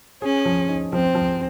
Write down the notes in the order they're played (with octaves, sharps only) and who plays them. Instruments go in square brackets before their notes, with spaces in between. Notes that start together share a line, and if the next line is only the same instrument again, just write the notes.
[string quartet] C#4 [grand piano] G#4
[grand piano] F3
D#4
[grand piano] F3 [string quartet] C4
[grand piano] F3